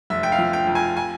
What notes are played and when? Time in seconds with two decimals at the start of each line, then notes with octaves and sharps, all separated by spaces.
0.10 F1 E5
0.23 G5
0.32 F5
0.39 F3
0.53 G5
0.67 F2
0.75 G#5
0.97 G#5